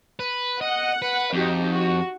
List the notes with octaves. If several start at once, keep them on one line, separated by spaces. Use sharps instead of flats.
B4
D#5 F#5
B4
F2 D#4 F#4 G4
F#4